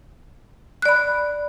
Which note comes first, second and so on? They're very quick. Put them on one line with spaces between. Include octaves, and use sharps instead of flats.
F#6 D5 B5